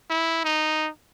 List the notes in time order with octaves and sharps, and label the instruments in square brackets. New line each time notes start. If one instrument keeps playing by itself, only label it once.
[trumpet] E4
D#4